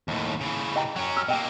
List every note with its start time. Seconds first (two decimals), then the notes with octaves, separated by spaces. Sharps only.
0.08 D#2 A2
0.41 C#3 E3
0.76 D#5 G5 A#5
0.96 F#3 C#4
1.17 E6 F6
1.28 B2 A#3 D#5 G5